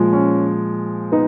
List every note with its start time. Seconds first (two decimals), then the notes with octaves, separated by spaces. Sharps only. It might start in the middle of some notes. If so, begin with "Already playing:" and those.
Already playing: A#2 F3 G#3
0.13 C#4
1.12 B3 D#4